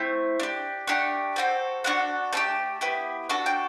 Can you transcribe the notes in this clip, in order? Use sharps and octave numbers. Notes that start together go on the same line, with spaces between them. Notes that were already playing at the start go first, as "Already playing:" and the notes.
Already playing: A3 C4 E4
D4 G4
A3 D4 G4 F#5
C4 F#4 A4 G5
D4 F#4 A4 F#5
A3 D4 G4 A5
B3 E4 G4
D4 F#4 A4 A5
G5